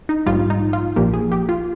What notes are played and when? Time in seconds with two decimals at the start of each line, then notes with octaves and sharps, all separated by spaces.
0.09 D#4
0.26 A#1 G#2 G3 F4
0.50 D#4
0.73 F4
0.96 A#1 A#2 F3 A#3 G4
1.14 G#4
1.32 G4
1.49 F4